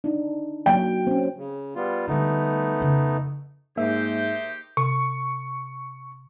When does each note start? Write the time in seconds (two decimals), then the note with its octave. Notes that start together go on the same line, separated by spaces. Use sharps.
0.04 D4 D#4
0.66 F#3 A#3 G5
1.07 C4 C#4
1.37 C#3
1.76 G3 B3 F4
2.08 D3 G3 A3 B3 D#4
2.80 F2 C#3
3.77 G#2 A#3 D#4 G4 C5 E5
4.77 C3 C#6